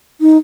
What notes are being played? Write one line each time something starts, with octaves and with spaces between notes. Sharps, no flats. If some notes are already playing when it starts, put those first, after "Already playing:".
D#4